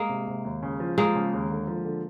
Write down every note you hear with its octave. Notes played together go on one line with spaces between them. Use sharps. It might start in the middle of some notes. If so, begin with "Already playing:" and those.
Already playing: G#3 A#3
C3
C3
D#2
C#3
F3
F3 G#3 A#3
C#3
D#2
D3
F3
D3